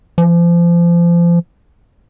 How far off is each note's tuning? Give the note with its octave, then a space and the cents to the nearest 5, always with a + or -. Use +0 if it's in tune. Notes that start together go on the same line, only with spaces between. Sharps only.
F3 -30